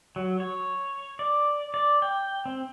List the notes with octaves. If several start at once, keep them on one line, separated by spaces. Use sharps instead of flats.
F#3
C#5
D5
D5
G5
C4